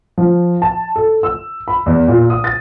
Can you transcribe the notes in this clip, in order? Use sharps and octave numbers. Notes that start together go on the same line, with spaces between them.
F3
A5
A4
E6
B5
E2
A#2
D#6
A6